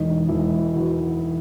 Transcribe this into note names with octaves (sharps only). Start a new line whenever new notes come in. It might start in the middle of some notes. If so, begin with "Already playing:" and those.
Already playing: E1 D#4
E1 E4
E3 F#4